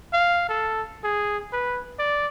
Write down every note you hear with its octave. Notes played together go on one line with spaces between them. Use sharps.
F5
A4
G#4
B4
D5